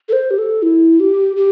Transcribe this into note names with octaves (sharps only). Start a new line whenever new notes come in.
A4
C5
G4
A4
E4
G4
G4